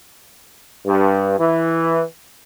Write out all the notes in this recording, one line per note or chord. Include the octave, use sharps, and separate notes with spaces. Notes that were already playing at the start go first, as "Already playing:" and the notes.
G2
E3